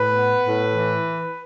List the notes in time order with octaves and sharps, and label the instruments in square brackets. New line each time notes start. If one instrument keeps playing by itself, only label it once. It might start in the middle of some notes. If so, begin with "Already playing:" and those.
Already playing: [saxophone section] A2 B4
B3
A2
E3